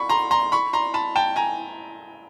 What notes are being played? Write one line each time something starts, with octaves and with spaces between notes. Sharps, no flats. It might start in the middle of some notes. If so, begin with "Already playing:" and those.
Already playing: B5 C#6
A#5 C6
A#5 C6
B5 C#6
A#5 C6
A5 B5
G5 A5
G#5 A#5